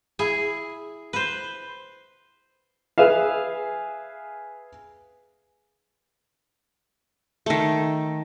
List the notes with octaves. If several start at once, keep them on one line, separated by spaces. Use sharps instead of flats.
E4 G#4
B4 C5
G#4 B4 E5 F5
D#3 A3